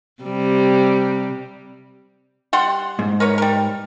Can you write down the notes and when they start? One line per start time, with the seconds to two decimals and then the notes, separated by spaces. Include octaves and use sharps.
0.22 C3 G3
2.53 G3 F#5 C6
2.99 G#2
3.20 A#4 B4 C#5
3.38 G3 A#4